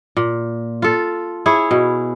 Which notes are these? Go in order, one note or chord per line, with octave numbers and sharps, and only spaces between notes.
A#2
F4 A4
E4 G#4 C#5
B2